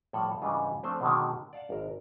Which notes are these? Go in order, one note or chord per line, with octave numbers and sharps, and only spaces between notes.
A2 F3 G3 A4 F#5
G#2 C#3 E3 G3 D4 F4
F3 A3 C4 D4 C5
B2 D3 D#3 F#3 G#3
D5 F5 F#5 A5
G#1 A#4